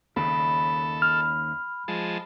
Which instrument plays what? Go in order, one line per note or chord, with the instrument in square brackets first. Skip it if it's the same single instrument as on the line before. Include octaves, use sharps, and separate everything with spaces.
[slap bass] D#2 C#3 [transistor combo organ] A4 [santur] B5
[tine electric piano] F6
[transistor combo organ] F3 G#3 A5